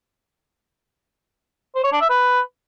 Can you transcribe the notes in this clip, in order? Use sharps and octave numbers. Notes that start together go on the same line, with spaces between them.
C5
C#5
D4
E5
B4